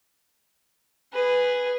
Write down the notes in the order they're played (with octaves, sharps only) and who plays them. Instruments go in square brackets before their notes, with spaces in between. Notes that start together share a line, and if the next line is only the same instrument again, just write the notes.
[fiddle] G#4 B4